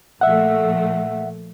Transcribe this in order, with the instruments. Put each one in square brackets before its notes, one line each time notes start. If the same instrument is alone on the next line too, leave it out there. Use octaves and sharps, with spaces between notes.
[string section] A#2 F3 A3 [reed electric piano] E5 F#5